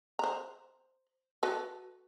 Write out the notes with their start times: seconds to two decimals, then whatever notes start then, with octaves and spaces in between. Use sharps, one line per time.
0.19 C5 A#5
1.43 F#4 A4 B4